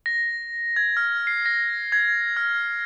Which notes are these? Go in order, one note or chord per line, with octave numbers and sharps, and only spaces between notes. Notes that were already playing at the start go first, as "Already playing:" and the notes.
A#6
G#6
F6
C7
A#6
G#6
F6